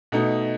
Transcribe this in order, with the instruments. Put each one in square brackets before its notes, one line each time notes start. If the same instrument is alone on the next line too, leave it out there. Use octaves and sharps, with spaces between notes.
[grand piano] B2 A3 D#4